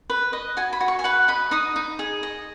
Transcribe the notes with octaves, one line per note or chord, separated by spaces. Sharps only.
B4
D#5
F#4 G#5
B5
F#4
C#6
G#5
B4 F#5
D#5 B5
D#4 D#6
D#4
G#4
D#5